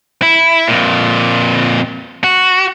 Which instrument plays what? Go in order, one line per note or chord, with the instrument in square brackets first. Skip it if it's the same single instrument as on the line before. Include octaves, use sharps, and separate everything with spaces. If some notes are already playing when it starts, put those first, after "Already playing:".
[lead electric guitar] E4
F2 A#2
F#4